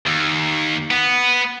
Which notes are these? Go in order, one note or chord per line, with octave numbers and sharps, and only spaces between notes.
D#2
B3